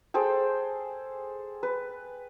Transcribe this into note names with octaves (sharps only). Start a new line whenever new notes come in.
G#4 A4 C5 G5
B4